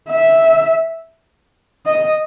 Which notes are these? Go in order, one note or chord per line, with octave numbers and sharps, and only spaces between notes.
E5
D#5